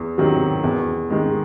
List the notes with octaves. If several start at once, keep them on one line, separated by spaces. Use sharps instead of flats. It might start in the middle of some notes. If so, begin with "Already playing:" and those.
Already playing: E2
C3 D#3 F#3
E2
D#3 G#3